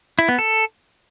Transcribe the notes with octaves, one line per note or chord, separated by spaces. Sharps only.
E4
B3
A4